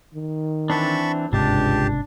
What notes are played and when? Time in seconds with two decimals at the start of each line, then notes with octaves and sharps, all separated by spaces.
0.14 D#3
0.70 E3 C4 D4 A5 B5 C#6
1.33 G1 C#2 G#2 C3 D4 G4 A5